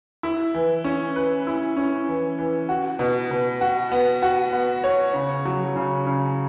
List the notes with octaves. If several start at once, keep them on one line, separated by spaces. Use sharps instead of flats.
E4
E3
C#4
B4
E4
C#4
E3
E3
F#4
B2
B2
F#4
B3
F#4
B3
C#5
C#3
F#3
C#3
C#3